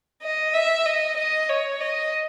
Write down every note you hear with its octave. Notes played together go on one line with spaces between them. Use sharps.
D#5
E5
D#5
D#5
C#5
D#5